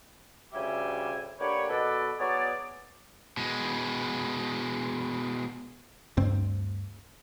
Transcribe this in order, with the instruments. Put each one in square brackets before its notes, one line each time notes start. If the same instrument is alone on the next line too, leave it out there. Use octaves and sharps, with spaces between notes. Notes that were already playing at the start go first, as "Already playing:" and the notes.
[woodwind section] D2 C#3 G3 G4 E5 G#5
D3 A#3 G4 B4 C#5
B2 A4 B4 D5
F#3 B3 G#4 C#5 D5
[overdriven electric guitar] B2 G#3
[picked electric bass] D2 G2 C4